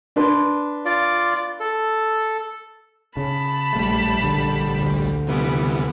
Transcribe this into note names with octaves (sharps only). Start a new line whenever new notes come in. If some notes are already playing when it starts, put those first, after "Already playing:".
D4 B4 C6
F4 D5
A4
C#3 A5 B5
A#1 G3 A3
D3
D2 D3
C3 E3 G3 B3